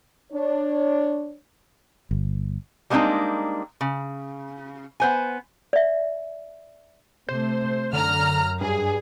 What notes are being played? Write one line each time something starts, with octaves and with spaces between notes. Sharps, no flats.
D4 C#5
G1
G3 G#3 A#3 C4 D4 D#4
C#3
B3 C5 G#5
D5 E5
C3 A3 C5
F#2 D3 A#5 F6
G2 G#4